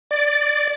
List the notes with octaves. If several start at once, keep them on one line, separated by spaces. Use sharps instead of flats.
D5